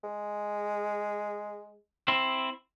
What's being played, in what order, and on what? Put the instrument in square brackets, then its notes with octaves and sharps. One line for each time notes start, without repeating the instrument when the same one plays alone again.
[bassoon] G#3
[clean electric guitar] C4 E4